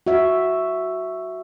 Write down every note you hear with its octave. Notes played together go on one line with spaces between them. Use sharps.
F#4 E5